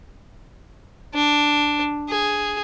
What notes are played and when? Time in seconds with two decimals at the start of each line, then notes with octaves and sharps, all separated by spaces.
1.15 D4
2.09 G#4